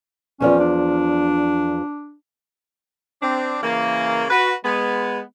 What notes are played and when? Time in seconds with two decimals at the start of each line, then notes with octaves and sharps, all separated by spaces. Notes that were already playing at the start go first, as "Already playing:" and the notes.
0.40 E2 F3 C#4 D5
0.60 D4
3.22 C4 D4
3.63 C#3 E3 A#3
4.31 F#4 B4
4.65 G#3 B3